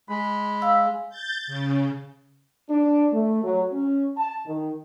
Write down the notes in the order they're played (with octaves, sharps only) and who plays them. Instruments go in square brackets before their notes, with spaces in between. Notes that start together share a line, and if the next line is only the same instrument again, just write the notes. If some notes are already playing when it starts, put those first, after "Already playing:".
[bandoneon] G#3 [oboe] B5
[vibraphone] F5 E6
[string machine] G6 A6
C#3
[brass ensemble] D4
A3
F#3
C#4
A5
D#3